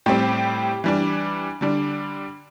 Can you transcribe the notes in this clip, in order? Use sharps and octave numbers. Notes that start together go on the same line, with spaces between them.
A2 G3 C4 G4
E3 G3 D4
D3 G3 D4